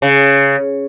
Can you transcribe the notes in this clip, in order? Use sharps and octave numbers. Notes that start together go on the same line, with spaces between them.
C#3